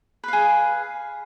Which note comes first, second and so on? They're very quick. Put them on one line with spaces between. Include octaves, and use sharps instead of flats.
B4 F5 G#4